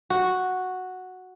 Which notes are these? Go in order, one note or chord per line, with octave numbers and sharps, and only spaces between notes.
F#4